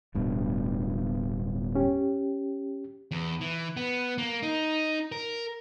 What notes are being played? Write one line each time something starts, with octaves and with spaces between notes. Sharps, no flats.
D1 G2 B2
C#4 G4
E2
E3
B3
A#3
D#4
A#4